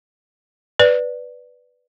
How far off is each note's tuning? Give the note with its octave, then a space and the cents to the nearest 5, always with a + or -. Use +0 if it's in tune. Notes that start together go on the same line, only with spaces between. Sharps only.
B4 +0 D5 +0